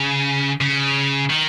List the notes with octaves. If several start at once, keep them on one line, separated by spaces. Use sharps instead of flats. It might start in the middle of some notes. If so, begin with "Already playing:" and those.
Already playing: C#3
C#3
D#3